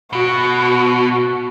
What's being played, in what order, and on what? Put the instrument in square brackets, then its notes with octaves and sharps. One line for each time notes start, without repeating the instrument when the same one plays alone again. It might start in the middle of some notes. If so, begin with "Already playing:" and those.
[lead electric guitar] B2 [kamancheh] F#4